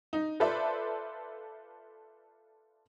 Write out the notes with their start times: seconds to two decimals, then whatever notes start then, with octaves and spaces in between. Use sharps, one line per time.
0.13 D#4
0.40 F4 A4 B4 C5 D5 E5